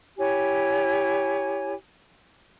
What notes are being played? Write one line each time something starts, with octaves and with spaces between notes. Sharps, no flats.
E4 G4 C#5 G#5